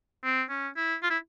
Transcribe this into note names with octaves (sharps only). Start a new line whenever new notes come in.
C4
C#4
E4
F4
E4